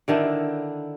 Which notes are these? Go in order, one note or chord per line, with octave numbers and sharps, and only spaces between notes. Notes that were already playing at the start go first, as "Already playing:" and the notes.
D3 D#3 D4 E4